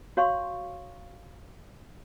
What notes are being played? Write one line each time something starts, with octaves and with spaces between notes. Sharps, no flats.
F#4 C#5 F5 C6 C#6